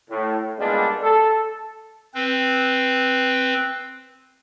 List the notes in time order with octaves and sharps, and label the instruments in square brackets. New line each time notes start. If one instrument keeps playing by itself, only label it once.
[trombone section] A2
G2 A#2 G3 G#3 B3 D4
A4
[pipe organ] C4 B4